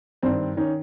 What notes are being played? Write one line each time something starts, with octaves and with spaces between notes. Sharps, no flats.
G2 D#3 C4 D4
D#3 C#4 D#4